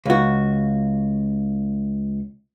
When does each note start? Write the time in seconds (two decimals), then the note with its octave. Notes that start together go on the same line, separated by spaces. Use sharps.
0.06 C#2 F#4